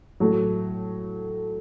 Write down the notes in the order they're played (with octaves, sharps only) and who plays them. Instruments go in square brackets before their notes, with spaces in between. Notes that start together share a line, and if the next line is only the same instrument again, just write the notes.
[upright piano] A2 F#3 A3